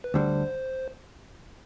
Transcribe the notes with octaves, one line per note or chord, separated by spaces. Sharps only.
B4
D2 D3 G3 C5